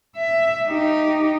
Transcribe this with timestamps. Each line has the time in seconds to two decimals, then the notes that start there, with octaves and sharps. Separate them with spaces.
0.16 E5
0.67 D#4 G4